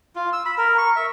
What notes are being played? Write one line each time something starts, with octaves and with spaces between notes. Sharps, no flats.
F4
E6
B5
A#4
C#6
E5